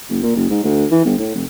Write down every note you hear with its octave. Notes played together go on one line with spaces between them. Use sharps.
F#1
A#2
F#1
G#2
D2
E3
G1
A2
F1